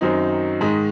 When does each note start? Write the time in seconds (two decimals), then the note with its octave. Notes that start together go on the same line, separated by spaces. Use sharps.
0.01 F#2 D#3 F#3 C4 D#4
0.61 G#2 D#3 G#3